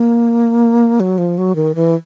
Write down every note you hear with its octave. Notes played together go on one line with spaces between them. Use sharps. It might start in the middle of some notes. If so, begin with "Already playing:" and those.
Already playing: A#3
F#3
F3
F#3
D#3
E3